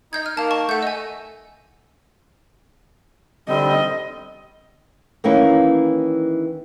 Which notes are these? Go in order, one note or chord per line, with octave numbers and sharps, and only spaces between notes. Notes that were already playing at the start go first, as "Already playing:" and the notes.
D#4 D#5 G6 G#6
F6
D#3 A#3 F5 A5
A5 C#6
A3 F#5 G6
D#5 G#5
D3 G3 C4 D#5
D#3 E3 A#3 C#4 E4